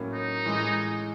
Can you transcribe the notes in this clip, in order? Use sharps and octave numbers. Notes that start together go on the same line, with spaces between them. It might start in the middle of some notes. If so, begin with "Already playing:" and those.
Already playing: A2 F#3 A#3 C#4
D#4
A2 E3 G#3